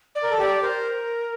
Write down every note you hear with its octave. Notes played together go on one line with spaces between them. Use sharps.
D5
A#4
A4
G4 D5
A#4 C5